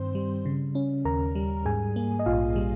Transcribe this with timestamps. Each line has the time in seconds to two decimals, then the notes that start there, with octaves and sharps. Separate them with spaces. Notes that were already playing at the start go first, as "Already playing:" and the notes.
Already playing: G2 D#3 C4 C5 C6
0.15 G3
0.45 C#3
0.75 C#4
1.05 D#2 A#4 A#5
1.35 G3
1.66 G#2 G#4 G#5
1.96 A#3
2.19 D#5
2.26 A#1 F4 F5
2.56 G3